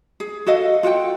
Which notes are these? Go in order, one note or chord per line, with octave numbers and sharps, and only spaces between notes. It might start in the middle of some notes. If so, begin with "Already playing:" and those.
G#4
F#4 A4 D#5 F5
F4 F#4 F#5 G5